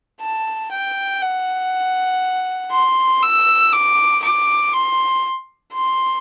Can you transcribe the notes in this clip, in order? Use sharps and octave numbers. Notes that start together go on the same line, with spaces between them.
A5
G5
F#5
C6
E6
D6
D6
C6
C6